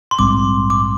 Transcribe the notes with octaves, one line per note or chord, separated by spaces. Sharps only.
C6
A#1 G#2 G3 C4 D6
D6